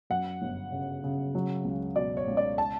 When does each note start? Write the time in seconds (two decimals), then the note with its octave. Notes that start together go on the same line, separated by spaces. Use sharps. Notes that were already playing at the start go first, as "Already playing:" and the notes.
0.10 F#2 F#5
0.42 G1
0.72 C#3
1.04 C#3
1.35 F#3
1.65 C#2
1.96 B2 D5
2.17 C#5
2.27 C#2
2.37 D5
2.58 A5